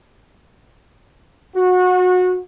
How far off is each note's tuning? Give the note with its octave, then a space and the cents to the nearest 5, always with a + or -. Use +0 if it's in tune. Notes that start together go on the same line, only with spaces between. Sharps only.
F#4 -25